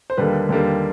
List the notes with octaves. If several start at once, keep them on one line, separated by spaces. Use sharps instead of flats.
C5
D#2 D3 G3 A#3 B4
D#2 D3 G3 A#3